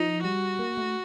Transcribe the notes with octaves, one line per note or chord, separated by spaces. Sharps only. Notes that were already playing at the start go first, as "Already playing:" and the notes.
Already playing: F3 D#4
G3 F#4
A#3
A3